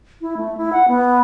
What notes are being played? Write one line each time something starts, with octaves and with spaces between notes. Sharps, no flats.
E4
A3
E4
F#5
B3